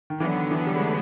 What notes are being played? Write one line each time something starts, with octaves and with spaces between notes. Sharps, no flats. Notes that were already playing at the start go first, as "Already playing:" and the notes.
D#3
D3 E3 F#3 B3
D#3
E3
G3
G#3
A3